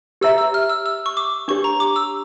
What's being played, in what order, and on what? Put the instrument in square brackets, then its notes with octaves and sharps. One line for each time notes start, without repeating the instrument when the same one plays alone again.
[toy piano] G4 C#5 E5 A#5 [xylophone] E6
[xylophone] E6
F6
E6
E6
C#6
D6
[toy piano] D4 G4 C#5 [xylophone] C#6
[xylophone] A#5
D6
E6